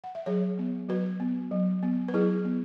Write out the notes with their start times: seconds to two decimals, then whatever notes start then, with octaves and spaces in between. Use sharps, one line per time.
0.04 F#5
0.15 E5
0.26 F#3 G#4 C#5
0.59 B3
0.89 F#3 F#4 B4
1.20 B3
1.51 F#3
1.83 B3
2.08 B4
2.13 F#3 E4 G#4
2.45 B3